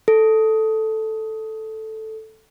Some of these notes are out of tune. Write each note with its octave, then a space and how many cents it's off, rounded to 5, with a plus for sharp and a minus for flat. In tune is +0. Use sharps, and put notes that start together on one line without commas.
A4 +0